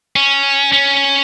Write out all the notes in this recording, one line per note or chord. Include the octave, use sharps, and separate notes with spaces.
C#4
C#4